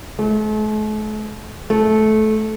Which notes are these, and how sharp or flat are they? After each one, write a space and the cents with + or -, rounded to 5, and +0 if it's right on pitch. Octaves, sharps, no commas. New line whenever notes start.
A3 -45
A3 -20